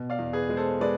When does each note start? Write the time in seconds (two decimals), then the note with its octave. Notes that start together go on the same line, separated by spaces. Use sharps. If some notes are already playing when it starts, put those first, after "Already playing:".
Already playing: B2
0.10 D5 F5
0.19 E2
0.33 G#4 B4
0.49 G#3
0.57 A4 C5
0.81 G#3 B4 D5